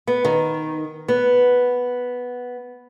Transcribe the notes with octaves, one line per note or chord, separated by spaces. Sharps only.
B3
D#3
B3